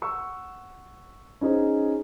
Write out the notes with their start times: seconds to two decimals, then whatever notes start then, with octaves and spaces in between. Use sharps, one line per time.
0.02 F#5 C#6 E6
1.41 C#4 D#4 G#4 C5